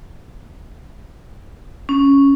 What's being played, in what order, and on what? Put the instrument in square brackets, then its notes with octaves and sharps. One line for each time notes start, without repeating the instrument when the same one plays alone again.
[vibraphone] C#4